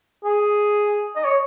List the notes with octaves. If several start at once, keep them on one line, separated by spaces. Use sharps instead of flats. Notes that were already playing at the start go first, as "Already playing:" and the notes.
G#4
D#5
C#5